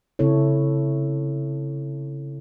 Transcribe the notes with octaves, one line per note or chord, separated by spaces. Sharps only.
C#3 C4 E4 A4 C#5